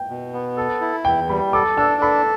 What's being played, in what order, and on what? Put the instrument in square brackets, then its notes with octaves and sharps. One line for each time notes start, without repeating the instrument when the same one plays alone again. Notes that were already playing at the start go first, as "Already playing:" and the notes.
Already playing: [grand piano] G5
[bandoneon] B2
B3
A4
E4
[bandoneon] E2 [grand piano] G5
[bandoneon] G3 [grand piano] B5
[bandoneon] A4 [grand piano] D6
[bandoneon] D4 [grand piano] E6
[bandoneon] A4 [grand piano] B5